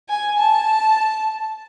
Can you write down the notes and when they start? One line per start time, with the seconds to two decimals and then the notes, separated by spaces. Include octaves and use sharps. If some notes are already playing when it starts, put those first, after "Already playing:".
0.09 G#5
0.38 A5